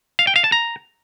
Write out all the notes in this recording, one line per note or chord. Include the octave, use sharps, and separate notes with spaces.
F5
G5
F5
A5
A#5